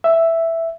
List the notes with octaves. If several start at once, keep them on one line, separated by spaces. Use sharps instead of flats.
E5